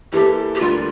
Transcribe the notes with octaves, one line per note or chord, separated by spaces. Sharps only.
E2 E3 A#3 E4 G4 A4
G4
D2 D3 G3 A#3 F4